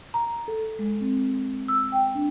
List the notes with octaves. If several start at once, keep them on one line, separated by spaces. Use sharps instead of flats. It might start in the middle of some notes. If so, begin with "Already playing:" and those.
A#5
A4
G#3
C4
E6
G5
D4